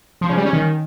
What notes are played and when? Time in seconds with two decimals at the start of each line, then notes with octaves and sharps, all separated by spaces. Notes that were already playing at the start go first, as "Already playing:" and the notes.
0.21 F3
0.29 C#3
0.37 G3
0.45 C#4
0.53 D#3